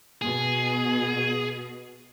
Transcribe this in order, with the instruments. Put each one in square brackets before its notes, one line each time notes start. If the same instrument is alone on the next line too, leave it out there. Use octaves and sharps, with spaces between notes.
[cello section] B2 [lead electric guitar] G#4